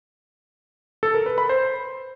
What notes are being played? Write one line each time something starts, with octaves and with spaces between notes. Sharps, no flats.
A4
A#4
B4
B5
C5